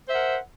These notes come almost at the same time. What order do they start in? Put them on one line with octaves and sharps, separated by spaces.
C5 E5 F#5 A#4